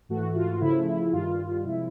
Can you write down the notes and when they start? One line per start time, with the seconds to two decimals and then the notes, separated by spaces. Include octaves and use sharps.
0.09 G#2 E3 A3 F#4
0.36 F4
0.61 C#3 F3 A3 E4
0.87 E4
1.13 G2 D#3 G3 F4
1.64 C3 F3 G#3 E4